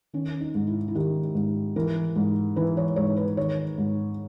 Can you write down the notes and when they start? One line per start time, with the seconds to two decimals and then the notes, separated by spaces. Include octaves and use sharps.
0.13 D#3 C#4
0.40 D#4
0.55 G#2
0.67 E4
0.88 E4
0.95 D#3 G4
1.35 G#2
1.76 E3 A#4
2.16 G#2
2.56 E3 B4
2.77 C#5
2.96 G#2 C#5
3.16 B4
3.37 D#3 C#5
3.78 G#2